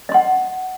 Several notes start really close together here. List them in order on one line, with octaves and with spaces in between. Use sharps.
D#5 C6 F#5